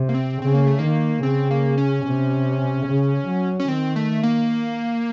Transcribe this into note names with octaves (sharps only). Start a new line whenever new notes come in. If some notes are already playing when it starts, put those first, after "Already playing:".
Already playing: C3
A#3
C4
C#3 C4
A#3
A3
D#3 A#3
C#3 C4
A#3
C#4
C3
C#3
F#3
C#4
D#3 C4
A3
A#3